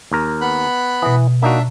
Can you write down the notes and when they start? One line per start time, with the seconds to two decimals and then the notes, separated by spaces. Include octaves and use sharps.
0.12 D#2 A#4
0.41 B3 B5 F#6
1.02 B2 E3 D#6
1.42 A#3 D4 D#4 F#4 E5